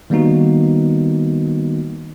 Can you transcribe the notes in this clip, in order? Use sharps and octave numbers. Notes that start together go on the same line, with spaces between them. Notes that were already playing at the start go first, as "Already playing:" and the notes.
D#3 G3 A#3 B3 D#4 F#4